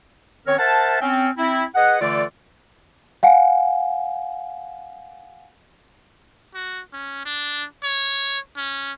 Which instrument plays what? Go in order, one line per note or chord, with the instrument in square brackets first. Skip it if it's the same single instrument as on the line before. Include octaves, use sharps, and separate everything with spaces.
[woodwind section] D#3 C4 C#4 A#4 C#5
A#4 C5 E5 F#5 A5
C4 C#4
C4 E4
G#4 B4 D#5 F#5
D3 E3 A3 F4 A4 D5
[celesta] F5 F#5 G#5
[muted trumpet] F#4
C#4
D4
C#5
C#4